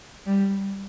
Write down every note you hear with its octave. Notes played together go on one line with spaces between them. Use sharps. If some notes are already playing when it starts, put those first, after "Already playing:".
G3